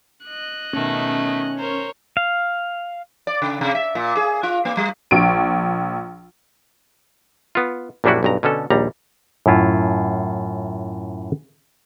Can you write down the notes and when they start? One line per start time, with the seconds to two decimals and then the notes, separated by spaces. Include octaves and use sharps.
0.24 D#5 F#6
0.73 B2 D#3 A3 C#4
1.58 A#4 C5 C#5
2.17 F5
3.27 D5
3.42 C#3
3.61 C3
3.75 E5
3.95 A#2
4.17 G#4
4.43 F4
4.65 A#3
4.77 G3
5.11 A#1 D7
7.55 B3 F4
8.04 A#1 F#2 G3 D4 E4 F#4
8.23 B1 G2 A#5
8.43 B2 D3 C#4 A4
8.70 A#1 D#2 G3 A#5
9.46 F#2 A2 E4 F4